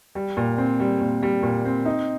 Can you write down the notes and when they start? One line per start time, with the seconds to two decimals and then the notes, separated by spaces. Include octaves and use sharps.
0.15 G3
0.37 A#2
0.58 C4
0.80 G3
1.01 A#2
1.23 G3
1.43 A#2
1.65 C4
1.85 D#4